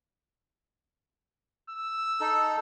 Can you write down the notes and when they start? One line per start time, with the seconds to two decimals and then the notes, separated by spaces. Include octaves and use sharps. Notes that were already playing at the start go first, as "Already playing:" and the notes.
1.70 E6
2.20 D#4 A4